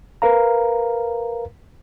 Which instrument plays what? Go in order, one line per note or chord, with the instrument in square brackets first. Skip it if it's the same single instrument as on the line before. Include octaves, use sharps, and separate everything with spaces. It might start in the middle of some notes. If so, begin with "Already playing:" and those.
[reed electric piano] A#4 B4 F5 A#5